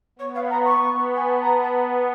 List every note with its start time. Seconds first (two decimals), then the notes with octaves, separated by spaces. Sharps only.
0.19 B3 C#5
0.35 F5
0.50 A#5
0.65 C#6
0.80 B3
1.15 G#5
1.28 A5
1.42 A#5
1.62 A5